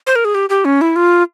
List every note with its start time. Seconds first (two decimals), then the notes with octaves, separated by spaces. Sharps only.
0.07 C5
0.16 A#4
0.25 G#4
0.35 G4
0.50 G4
0.65 C#4
0.81 E4
0.96 F4